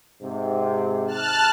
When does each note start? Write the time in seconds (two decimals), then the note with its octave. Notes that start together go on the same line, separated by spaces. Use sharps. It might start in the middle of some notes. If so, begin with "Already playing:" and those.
0.21 G#2 C3
1.07 A5 F6 F#6